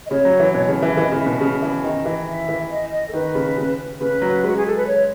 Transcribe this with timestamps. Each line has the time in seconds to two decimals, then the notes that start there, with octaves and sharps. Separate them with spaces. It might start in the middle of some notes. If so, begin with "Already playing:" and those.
0.06 D#5
0.11 C#3 C#5
0.25 F#3
0.40 E3
0.54 B2
0.68 C#3
0.82 E3
0.86 E5
0.97 E3 D#5
1.11 C#3
1.19 E5
1.26 B2
1.41 C#3
1.62 E3
1.84 D#3 D#5
2.05 E3
2.27 E5
2.49 E3
2.71 D#5
2.92 D#5
3.08 A4
3.13 D#3 B4
3.35 C#3
3.57 C#3
4.00 C#3 B4
4.22 F#3
4.43 G#3 F#4
4.57 G#4
4.67 A4
4.77 B4
4.87 C#5